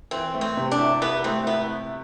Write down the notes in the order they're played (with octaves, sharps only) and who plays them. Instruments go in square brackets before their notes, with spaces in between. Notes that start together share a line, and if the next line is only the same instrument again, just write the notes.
[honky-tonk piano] E3 [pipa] C4
[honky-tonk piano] A3
[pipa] C4
[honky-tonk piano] C3
[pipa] D4
[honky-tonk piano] E4
[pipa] B3 [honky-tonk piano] E4
[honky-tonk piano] A3 [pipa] C4
[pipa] B3 [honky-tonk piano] E4